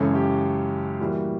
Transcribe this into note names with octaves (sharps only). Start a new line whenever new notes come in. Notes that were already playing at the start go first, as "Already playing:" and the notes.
Already playing: F#2 C#3 E3 G#3 C#4 A4
G4
A2 E3 G3 A#3 F#4